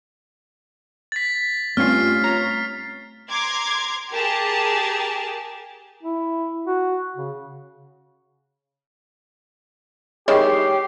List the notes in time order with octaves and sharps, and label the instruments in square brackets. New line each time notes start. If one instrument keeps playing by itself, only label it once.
[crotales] A6 B6
[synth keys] G2 C#4 F4 [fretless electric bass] A3 C4 [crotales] F6 C7
[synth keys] C#5 A#5
[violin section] A#5 C6 D6 G#6
G4 G#4 A#4 A5
[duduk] E4
F#4
C#3
[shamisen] D#3 G#3 E4 [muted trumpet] G4 [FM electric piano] C#5 C7